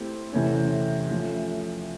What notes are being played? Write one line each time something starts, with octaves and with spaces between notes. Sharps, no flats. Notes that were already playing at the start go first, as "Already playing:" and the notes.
Already playing: A3 C4 E4 G4 C5
E2 C3 E3 A3 C#4
F3 A3 C#4